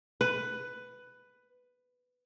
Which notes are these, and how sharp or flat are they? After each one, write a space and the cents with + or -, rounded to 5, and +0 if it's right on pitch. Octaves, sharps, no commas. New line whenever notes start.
B4 +10